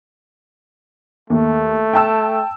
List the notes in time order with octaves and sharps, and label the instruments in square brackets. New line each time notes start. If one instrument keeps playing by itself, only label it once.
[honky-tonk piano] D#2 [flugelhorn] A3
[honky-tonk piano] G5 A5 E6